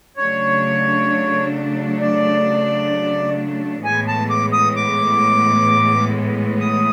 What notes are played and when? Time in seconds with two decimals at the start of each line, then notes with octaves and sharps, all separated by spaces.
0.17 C#3 F#3 A3 D4 C#5
2.01 D5
3.84 A2 E3 G#3 B3 G#5
4.08 A5
4.30 D6
4.53 D#6
4.76 D6
6.61 D#6